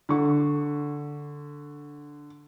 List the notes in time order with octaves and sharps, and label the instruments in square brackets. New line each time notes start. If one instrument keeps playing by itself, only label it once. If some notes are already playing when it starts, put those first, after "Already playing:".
[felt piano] D3 C#6